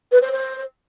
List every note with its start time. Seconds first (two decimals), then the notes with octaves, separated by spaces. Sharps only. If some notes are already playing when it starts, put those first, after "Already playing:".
0.12 B4
0.22 C5
0.32 C5